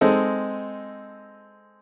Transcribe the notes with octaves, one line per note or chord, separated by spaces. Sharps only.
G#3 C4 D#4 A4